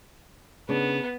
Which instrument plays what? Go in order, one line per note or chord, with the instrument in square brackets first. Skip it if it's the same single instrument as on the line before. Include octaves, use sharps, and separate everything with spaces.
[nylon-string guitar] C#3 D4 [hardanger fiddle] B3